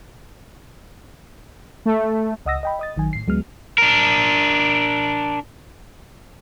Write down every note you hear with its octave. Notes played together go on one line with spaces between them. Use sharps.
A3
C#2 D#5 F#5 D#6 E6 A#6
D#5 G5 B5
D#5 D#6 A6
A1 D#3 F#3 G#5
A2 C7
D2 F#3 G#3 B3 F6
D4 A#4